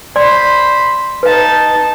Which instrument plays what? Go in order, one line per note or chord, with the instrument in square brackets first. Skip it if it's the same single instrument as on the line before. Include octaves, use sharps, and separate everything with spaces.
[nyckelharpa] C5 B5 [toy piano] D5 C6
[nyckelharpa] D#4 A5 [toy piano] B4 F5